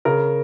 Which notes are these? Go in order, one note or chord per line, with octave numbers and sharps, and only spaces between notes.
C#3 A#4